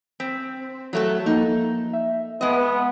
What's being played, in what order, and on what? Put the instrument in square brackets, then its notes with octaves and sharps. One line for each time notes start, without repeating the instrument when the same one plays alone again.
[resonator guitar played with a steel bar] C4 [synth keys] B6
[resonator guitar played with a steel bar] F#3 A3 A4
[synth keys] F3 A#3 [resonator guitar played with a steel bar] D#4
[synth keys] E5
[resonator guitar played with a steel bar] G#3 D#5 [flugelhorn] B3